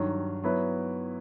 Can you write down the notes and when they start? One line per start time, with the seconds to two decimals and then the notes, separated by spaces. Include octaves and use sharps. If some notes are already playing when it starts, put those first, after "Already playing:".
Already playing: G2 D#3 F#3
0.44 F#3 B3 E4 B4